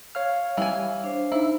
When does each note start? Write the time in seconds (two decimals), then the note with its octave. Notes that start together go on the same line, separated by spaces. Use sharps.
0.15 C#5 F5 F6
0.57 E3 G3 G#5
1.04 D4 C5
1.32 D#4 E4